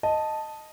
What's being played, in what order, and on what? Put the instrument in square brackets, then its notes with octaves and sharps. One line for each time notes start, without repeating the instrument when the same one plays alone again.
[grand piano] D#5 [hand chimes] A5